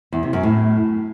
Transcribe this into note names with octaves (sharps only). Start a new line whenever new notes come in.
E2
C3
F#2
A2